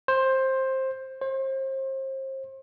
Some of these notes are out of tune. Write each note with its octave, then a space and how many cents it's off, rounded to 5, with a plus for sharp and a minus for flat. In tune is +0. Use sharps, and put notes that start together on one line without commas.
C5 +15
C5 +35